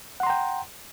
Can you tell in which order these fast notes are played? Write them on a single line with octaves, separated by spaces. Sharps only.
F#5 C6 A#5 G5